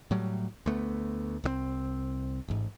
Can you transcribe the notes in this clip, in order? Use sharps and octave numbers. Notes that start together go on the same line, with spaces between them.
A2 F#3 G3
D2 A3 B3
C2 F#3 C4
A1 G#2